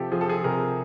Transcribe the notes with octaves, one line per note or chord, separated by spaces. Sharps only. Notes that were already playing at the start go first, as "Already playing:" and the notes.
Already playing: C3 F3 G4 A4
F3 G#4
A4
G#4
C3 G#4 A#4